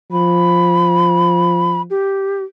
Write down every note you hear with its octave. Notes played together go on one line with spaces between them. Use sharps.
F3 B5
G4